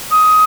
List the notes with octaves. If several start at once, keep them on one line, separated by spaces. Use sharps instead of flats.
D#6